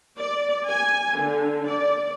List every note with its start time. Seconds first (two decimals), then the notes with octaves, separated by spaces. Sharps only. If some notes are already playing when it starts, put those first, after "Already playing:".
0.18 D5
0.68 G#5
1.18 D3
1.68 D5